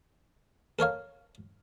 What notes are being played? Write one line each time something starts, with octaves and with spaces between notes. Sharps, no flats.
A4 A#4 C#5 F5